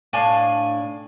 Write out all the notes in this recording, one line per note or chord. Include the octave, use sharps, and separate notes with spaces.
A2 D4 F5 G#5